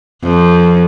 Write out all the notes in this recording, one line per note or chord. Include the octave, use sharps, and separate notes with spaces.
F2